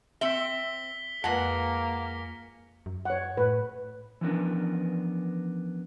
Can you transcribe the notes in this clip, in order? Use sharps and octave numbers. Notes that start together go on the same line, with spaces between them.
C4 E5 B6 C#7 G7
F2 G#3 A#3 B4 F#5 A#6 C#7
F#2
C#5 F#5
A2 B4
E3 F3 B3 C#4 D4 A#4